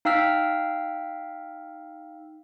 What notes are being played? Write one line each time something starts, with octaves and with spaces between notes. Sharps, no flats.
D#4 F5 G5 E6 F6 B6